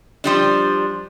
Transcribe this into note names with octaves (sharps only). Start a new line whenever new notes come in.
F3 G3 D4